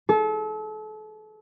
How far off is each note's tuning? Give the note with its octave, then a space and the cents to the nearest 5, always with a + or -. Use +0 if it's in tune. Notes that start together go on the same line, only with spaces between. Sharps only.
A4 -35